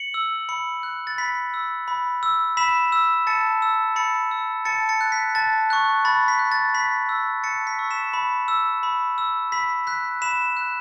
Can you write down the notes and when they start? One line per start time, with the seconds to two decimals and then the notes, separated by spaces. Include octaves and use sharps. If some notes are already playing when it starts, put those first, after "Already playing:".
Already playing: C#7 F#7
0.14 E6
0.49 B5 C#7 F#7
0.83 F#6
1.07 A6
1.18 B5 B6
1.54 E6
1.88 B5
2.23 E6
2.57 B5 B6 E7
2.92 E6
3.27 A5 A6 C#7
3.62 E6
3.96 B5 A6 C#7
4.31 E6
4.65 A5 A6 C#7
4.89 A6 C#7
5.01 F#6
5.12 B6
5.35 A5 A6
5.70 C#6 F#6
6.05 B5 A6
6.28 B6
6.39 F#6
6.52 A6
6.74 B5 B6
7.09 E6
7.44 A5 A6 C#7
7.67 B6
7.79 C#6 E6
7.90 B6 E7
8.14 B5
8.48 E6
8.83 B5
9.18 E6
9.52 B5 B6
9.87 F#6 B6
10.22 B5 B6 E7
10.57 F#6